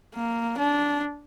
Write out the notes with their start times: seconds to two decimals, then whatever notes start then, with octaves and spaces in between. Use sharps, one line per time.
0.15 A#3
0.58 D4